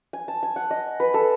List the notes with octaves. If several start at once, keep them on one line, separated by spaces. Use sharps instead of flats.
G#5
A5
G#5
F#5
D#5
B4
A4